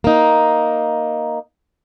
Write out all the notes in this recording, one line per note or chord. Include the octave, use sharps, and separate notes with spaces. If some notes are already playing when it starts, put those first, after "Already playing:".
A#3 D#4